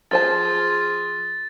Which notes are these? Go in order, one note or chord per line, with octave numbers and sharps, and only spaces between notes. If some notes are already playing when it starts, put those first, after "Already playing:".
F3 F4 G#4 C5 A5 A6